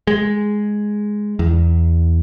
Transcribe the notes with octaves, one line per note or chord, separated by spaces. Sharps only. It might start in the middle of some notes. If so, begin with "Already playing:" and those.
G#3
E2